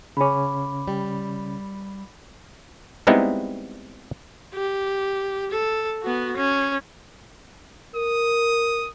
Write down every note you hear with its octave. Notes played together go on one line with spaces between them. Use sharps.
C#3 C#4 B5 D6
G3
G3 G#3 B3 C4 D#4 E4
G4
A4
B3 F#4
C#4
A#4 D#6